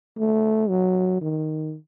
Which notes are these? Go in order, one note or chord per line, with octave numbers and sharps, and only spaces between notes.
A3
F#3
D#3